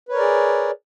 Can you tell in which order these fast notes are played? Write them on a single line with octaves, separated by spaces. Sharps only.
B4 C#5 A#4 D5 G#4